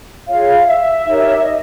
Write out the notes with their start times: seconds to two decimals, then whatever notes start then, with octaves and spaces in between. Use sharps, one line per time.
0.27 F4 G#4 C#5 F5
0.66 E5
1.05 D#4 G4 A#4 C#5
1.44 D#5